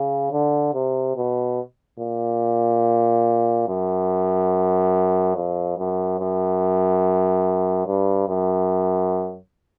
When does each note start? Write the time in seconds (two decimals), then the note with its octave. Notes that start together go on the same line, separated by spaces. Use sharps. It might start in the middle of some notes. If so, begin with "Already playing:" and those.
Already playing: C#3
0.32 D3
0.74 C3
1.16 B2
1.99 A#2
3.68 F#2
5.35 F2
5.78 F#2
6.20 F#2
7.87 G2
8.29 F#2